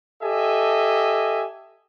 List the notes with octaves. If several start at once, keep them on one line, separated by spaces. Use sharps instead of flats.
G4 A4 D#5 E5 G#5